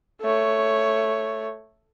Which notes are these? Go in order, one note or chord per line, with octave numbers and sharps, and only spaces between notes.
A3 C#5